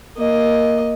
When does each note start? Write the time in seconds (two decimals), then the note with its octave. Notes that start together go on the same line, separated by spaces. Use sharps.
0.17 A#3 D#5